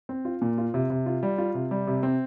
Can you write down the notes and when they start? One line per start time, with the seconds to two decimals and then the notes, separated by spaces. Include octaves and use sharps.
0.09 C4
0.25 F4
0.42 A#2
0.58 F4
0.74 C3
0.90 C3
1.06 F4
1.23 G3
1.38 F4
1.54 C3
1.71 G3
1.87 C3
2.03 C4